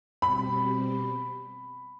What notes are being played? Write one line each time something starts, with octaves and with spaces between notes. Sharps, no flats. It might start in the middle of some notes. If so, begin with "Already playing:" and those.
B2 G3 C4 G4 B5